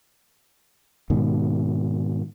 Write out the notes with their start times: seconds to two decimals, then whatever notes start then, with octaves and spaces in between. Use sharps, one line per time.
1.10 G#2 B2 D#3